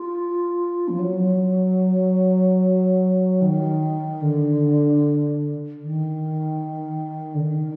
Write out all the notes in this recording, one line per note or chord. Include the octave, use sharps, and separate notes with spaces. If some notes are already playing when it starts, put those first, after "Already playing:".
Already playing: F4
F3
F#3
D#3
D3
D#3
D3
D#3